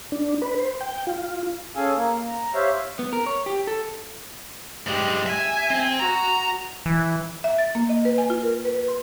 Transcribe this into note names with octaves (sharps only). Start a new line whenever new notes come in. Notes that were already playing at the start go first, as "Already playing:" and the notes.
D4
B4
C5
G5
F4
C#4 G#4 A4 F5 G#5
A#3
A#5
G4 C5 C#5 E5 F5
B3
A#4
C#5
G4
A4
G2 G#3 G4
E5 G#5
C4
F#4 A#5
E3
E5
A6
A#3
D#5
B4
G#5
F4
A#4
B4
B4
C6